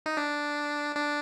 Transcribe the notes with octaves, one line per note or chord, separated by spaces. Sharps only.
D#4
D4
D4